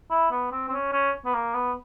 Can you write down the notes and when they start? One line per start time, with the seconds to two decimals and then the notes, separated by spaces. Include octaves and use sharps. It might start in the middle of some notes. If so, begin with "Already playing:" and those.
0.11 E4
0.31 B3
0.52 C4
0.68 C4
0.72 C#4
0.93 C#4
1.25 B3
1.34 A#3
1.54 B3